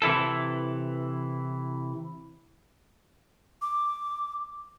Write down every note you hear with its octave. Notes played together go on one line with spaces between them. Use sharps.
C3 E3 E4 A4
D6